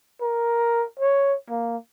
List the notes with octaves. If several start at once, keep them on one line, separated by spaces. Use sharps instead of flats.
A#4
C#5
A#3